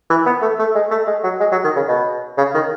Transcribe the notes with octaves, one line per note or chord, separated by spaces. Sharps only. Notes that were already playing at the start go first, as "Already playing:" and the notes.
E3
B3
A3
A3
G#3
A3
G#3
F#3
G#3
F#3
D#3
C#3
B2
C#3
D#3